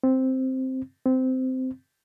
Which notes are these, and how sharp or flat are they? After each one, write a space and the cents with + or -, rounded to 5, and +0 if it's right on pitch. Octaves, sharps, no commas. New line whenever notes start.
C4 +0
C4 -15